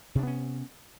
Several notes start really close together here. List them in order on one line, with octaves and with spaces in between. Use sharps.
C3 D4 B3 C#4